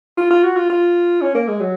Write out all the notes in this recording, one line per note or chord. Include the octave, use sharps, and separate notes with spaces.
F4
F4
F#4
F4
F4
C#4
A#3
G#3
F#3